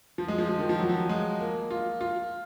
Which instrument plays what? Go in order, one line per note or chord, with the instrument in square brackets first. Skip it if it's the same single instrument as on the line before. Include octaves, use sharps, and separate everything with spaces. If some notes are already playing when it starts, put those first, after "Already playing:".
[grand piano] F3
G#3
F3
F3
D#3
F3
F#3
F3
G#3
A#3
F4
F4